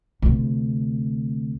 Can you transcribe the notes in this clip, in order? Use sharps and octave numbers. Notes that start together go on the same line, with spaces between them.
D2 C3